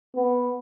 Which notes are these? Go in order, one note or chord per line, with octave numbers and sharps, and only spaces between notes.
B3